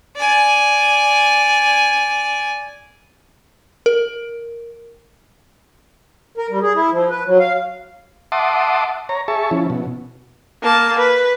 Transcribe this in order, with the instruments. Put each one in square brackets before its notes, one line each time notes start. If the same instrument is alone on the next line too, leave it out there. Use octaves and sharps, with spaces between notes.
[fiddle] D5 G#5
[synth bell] A#4
[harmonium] A#4
G3
G#4
E4
F3
B4
F#3
F5
[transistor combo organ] E5 F#5 A5 C6 D6 D#6
C#5 A#5
G#4 E5 A5 C#6
F3 C#4 E4
B2
[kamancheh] A#3 A5
B4